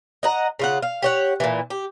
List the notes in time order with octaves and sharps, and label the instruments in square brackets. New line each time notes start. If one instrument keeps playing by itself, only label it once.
[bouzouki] D#5 F#5 A#5
C#3 F4 F#5
F5
G4 C#5 F#5
A#2 E3
G4